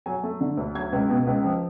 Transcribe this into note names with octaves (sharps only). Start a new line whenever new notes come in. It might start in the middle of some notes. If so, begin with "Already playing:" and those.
F#3 G#5
A3
D3
D2
F#3 G#6
C#2
B2
C#2
F3